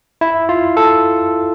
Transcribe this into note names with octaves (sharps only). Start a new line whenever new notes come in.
E4
F4
A4